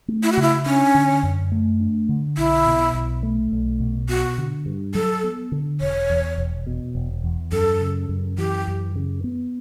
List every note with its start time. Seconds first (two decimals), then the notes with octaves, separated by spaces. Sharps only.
0.08 A3
0.23 E4
0.32 F#4
0.37 C#3 E4
0.66 C#4 D4
0.95 D3
1.23 F#2
1.52 A3
1.80 D4
2.09 D3
2.38 B1 E4
2.66 B2
2.95 B1
3.23 A3
3.52 B1
3.80 B2
4.09 B3 F#4
4.38 D3
4.66 G2
4.95 F#3 A4
5.24 B3
5.52 D3
5.81 E1 C#5
6.10 E2
6.38 E1
6.67 B2
6.95 E1
7.24 E2
7.52 F#2 A4
7.81 C#3
8.09 F#2
8.38 E3 G4
8.67 F#2
8.96 C#3
9.24 B3